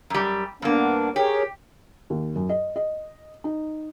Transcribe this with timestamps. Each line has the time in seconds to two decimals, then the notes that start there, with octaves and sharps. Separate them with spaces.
0.10 F#2 G3
0.62 G2 A#3 B3 D4
1.16 G4 G#4 A#4 C#5
2.10 D#2
2.36 F#2
2.49 D#5
2.76 D#5
3.44 D#4